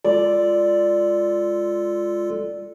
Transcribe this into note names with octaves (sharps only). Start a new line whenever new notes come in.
G#3 F4 A4 D5